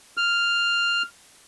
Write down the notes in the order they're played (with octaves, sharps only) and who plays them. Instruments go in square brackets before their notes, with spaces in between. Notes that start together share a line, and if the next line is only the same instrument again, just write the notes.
[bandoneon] F6